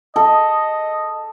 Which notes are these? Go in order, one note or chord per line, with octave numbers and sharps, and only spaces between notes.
A4 D#5